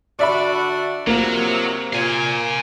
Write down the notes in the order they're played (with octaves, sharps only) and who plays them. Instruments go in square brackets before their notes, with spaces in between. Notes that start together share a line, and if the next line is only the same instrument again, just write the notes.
[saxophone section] D3 D4 F#4 [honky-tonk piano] D5 E5 B5
[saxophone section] C3 F3 [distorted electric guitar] F#3 [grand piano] A#3
[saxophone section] A#2 [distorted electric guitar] F5 G#5